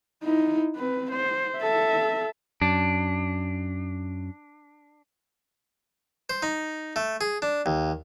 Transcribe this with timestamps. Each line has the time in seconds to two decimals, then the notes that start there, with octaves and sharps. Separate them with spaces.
0.24 D#4 E4
0.76 C4 B4
1.12 C5
1.58 A4 E5
2.62 F#2 D4
6.30 C5
6.43 D#4
6.96 A3
7.21 G#4
7.42 D4
7.66 D#2